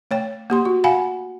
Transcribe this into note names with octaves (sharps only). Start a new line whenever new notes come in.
A3 C#5 G5
A#3 G4 C6
F#4
F5 F#5 G#5 B5